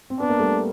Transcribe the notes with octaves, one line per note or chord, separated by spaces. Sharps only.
C4
B3 D4
A#3
G3 A3